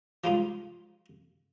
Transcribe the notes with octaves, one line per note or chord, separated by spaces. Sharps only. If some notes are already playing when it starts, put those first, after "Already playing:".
F3 G3 G#3 D#4 F4